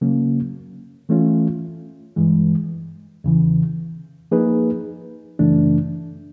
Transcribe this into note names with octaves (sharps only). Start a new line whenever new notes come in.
C#3 F#3 A#3 C#4
E3 A3 C#4 F4
G2 E3 G#3
E2 C#3 E3
F3 A#3 D#4 G#4 B4
F#2 C#3 E3 A3 D4